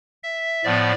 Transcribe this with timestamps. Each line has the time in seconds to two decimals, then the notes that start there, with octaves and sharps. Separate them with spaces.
0.23 E5
0.64 A2 F3 B3 D5